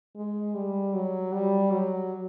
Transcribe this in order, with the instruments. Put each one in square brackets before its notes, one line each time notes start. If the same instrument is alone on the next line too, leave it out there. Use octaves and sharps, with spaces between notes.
[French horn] G#3
G3
F#3
G3
F#3